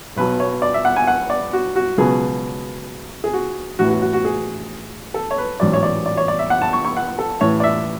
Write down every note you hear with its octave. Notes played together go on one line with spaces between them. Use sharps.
B1 B2 F#3 B4
C#5
D5
E5
F#5
G#5
F#5
D5
F#4
F#4
C#2 B2 F#3 G#4
G#4
F#4
A1 A2 E3 F#4
F#4
F#4
F#4
G#4
A4
C#5
B4
A1 G#2 F#3 D5
C#5
D5
D5
C#5
D5
E5
F#5
A5
C#6
C#6
F#5
A4
A1 A2 E3 C#5
D5
E5